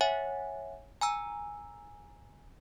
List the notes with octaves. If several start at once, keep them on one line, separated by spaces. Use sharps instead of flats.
C#5 E5 F#5 G#5
G#5 A#5 E6